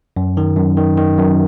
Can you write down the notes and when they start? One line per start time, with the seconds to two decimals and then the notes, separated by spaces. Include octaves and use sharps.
0.17 F#2
0.37 D#3
0.57 F#2
0.77 D#3
0.98 D#3
1.18 F#2